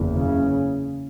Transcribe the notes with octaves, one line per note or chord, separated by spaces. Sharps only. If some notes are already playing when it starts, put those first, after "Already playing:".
Already playing: F#1 E2
C#3